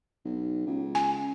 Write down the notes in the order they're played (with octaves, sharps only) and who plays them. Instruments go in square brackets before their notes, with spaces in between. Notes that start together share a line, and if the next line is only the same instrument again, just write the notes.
[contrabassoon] B1
C#2
[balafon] G#5